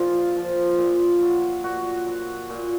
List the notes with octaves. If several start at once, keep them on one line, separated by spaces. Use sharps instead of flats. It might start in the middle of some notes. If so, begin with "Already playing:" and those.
Already playing: A#2 F3 F4
F3
A#2
F#3
A#2 F#4
F#3
A#2